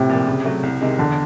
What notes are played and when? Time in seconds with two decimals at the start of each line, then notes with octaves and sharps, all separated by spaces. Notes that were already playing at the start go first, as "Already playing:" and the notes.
Already playing: A2 C3
0.09 A#2 F3 A#3
0.27 C#3
0.45 F#3 A3
0.63 C2
0.81 C3 D#3 G#3
0.98 E2 D3